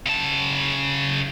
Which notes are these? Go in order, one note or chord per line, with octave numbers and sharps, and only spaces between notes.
C#3 A5